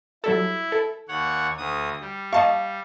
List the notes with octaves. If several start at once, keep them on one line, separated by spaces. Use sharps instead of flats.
F#3 G3 E4 A4
A4
D#2 C#5 F#5
D2 D#6
G3
D#5 F5 A5 C#6